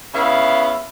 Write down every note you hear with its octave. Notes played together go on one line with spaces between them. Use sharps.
C#3 B3 E4 E5 F5